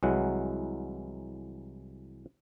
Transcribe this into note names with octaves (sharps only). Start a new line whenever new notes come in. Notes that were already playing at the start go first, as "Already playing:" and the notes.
C2 E3 F#3 G#3 F#5